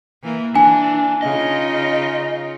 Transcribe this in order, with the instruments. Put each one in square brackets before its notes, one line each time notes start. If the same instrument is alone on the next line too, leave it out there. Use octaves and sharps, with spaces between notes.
[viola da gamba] E3 A#3
[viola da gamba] E3 [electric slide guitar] D4 [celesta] G#5
[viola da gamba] C#3 D#4 F4 [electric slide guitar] D#5